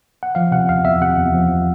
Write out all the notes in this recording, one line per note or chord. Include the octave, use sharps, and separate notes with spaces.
F#5
F3 F5
C3 F#5
E2 F5
E2 E5
C3 F#5
E2
F3